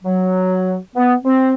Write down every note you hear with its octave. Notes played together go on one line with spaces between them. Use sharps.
F#3
B3
C4